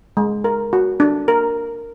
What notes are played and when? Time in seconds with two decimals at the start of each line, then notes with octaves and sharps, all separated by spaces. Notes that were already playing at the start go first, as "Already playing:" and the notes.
0.17 G#3
0.44 A#4
0.73 F#4
1.00 D4
1.28 A#4